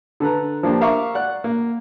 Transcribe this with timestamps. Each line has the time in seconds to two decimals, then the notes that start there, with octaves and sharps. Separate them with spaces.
0.20 D3 A4 B4 A#5
0.63 F3 A#3 D4 G4
0.81 A#4 E5 F5 A#5 C#6 D6
1.14 D5 F#5 F#6
1.44 A#3